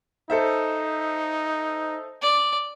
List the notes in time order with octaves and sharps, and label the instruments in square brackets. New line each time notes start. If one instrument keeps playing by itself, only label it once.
[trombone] D#4 [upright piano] A4 C5 E5
[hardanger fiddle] D5